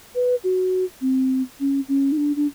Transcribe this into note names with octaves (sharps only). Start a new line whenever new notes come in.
B4
F#4
C4
C#4
C#4
D#4
D4
D4